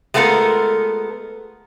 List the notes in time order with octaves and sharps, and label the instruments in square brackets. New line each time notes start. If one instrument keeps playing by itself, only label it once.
[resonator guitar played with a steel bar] G#3 A3 B3 F4 A4 A#4